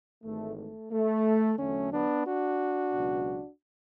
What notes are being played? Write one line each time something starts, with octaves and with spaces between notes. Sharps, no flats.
G#1 G#2 E3 A3
A3
A3
E2 D3 F#3 A3 C#4
B3 D4
D4 F#4
C#2 B2 F#3